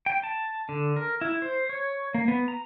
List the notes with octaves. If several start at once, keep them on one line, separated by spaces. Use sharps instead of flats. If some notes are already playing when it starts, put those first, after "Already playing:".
G5
A5
D3
A#4
E4
C5
C#5
A#3
B3
A#5